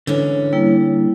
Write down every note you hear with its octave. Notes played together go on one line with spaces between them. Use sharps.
G#2 D3 E3 C#4
G3 A#3 E4